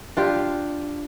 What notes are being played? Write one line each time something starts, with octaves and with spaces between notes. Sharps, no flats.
D4 F4 G4